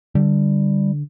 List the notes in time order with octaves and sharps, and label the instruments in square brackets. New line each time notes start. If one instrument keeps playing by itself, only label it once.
[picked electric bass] D3 [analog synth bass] G3